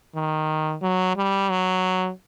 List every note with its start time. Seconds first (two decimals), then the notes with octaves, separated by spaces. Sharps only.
0.15 D#3
0.82 F#3
1.16 G3
1.50 F#3